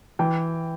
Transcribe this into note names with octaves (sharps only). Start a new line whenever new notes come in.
E3 G5